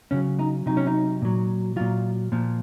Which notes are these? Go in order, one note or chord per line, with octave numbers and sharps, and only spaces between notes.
C#3 F#3 C#4
D#4
C3 F#3 D#4
C#4
D#4
A#2 F#3
A#2 F#3 F4
A#2 F3